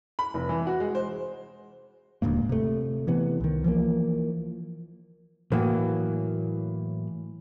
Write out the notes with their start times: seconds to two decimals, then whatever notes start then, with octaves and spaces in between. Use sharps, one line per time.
0.19 B5
0.34 F1
0.49 E3
0.67 F#4
0.80 G#3
0.95 C5
2.22 D#1 D2 G#2 A#3
2.49 C3 A3
3.07 C3 E3 B3
3.40 C2 D#3
3.64 E3 F3 A#3
5.52 A2 E3 F#3 A#3